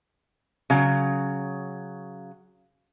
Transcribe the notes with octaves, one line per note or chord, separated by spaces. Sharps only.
C#3 F#3